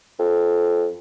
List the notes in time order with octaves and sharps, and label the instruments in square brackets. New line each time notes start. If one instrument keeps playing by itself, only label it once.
[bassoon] F2